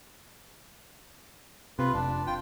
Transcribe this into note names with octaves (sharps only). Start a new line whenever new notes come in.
C3 F4 B4
F1 D4
F4 G5